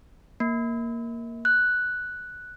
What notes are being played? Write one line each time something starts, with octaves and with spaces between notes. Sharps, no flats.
A#3
F#6